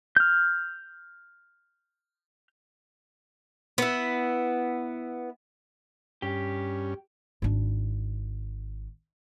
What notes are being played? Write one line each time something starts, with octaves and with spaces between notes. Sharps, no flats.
F6 G6
B3 E4
G2 C#4 G4
G#1 D4